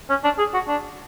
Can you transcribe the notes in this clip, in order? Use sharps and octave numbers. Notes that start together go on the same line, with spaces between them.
C#4
D4
G#4
F#4
D4